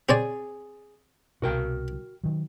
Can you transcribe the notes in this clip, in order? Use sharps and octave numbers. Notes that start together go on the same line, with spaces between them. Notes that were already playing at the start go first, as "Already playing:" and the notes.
C4 G#4 C#5 D5 G#5
C2 B2 F#4 A#4 G5
D#3 F#3